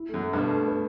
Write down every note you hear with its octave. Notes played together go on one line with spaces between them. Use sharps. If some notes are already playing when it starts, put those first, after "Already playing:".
Already playing: E4
F#2 A3
A3
G2 B2 B4
A3
B4